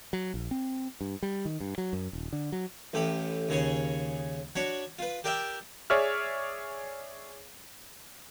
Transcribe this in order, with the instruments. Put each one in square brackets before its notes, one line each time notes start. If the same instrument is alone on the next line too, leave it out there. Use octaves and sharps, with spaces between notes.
[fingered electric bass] F#3
A#1
C4
G2
G3
D#3
G2
F#3
F#2
D#1
D3
F#3
[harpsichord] A1 A2 G4 B5
D#2 C#3 G#4 C#5
D4 F#4 C#5 B5
F4 B4
G4 A#4 D5 E5 G5
[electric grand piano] G#4 C#5 D5 E5 F6